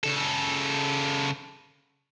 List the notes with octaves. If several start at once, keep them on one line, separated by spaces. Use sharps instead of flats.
C#3 A4